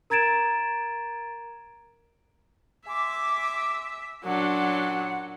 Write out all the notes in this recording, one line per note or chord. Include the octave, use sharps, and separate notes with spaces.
A#4 A#5 G#6 A6 D7 E7
E5 G#5 C6 D6
F#2 A#2 F#3 D4 F#5